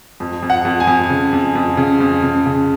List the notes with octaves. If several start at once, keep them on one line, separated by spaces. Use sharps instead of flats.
F2
F2
F#5
F2
G#5
F2
C#3
F2
F2
C#3
F2
C#3
C#3